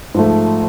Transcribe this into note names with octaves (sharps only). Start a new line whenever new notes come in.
G#2 F3 A3